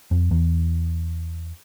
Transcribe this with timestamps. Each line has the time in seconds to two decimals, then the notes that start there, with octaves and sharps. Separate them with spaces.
0.11 F2
0.31 E2